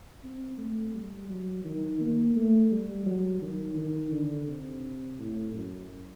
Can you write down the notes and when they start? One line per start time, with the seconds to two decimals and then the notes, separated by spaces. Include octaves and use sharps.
0.24 C4
0.58 A3
0.94 G3
1.29 F#3
1.65 D#3
2.00 A#3
2.36 A3
2.72 G3
3.06 F#3
3.42 D#3
3.77 D#3
4.12 D3
4.48 C3
5.19 A2
5.54 F#2